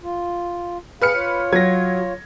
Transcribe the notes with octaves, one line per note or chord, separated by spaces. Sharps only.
F4
G#4 B4 F5 F6 C#7
F4 C#5
F#3 G#6 A#6